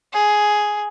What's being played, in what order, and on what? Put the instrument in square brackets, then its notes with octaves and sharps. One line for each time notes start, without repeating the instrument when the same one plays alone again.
[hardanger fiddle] G#4